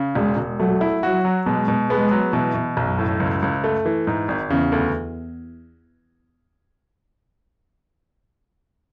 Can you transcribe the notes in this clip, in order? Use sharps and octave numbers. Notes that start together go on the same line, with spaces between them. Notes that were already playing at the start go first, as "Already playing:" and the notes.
Already playing: C#3
E1 G#3
E1
F#3 A3
E4
F#3 F#4
F#3
B2 G#3
B2
G#3 B3
F#3
B2 E3
B2
B1 F#2
A2
C#2
C#2
A3
E3
G#2
G#1
E2 C#3
D2